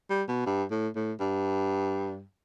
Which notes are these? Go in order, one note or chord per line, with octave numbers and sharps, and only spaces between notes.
G3
B2
G2
A2
A2
G2